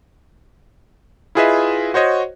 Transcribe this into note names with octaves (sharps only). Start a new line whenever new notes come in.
E4 F4 G#4 B4 D#5 E5
F#4 C5 C#5 D#5